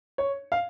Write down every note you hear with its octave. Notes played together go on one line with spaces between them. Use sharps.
C#5
F5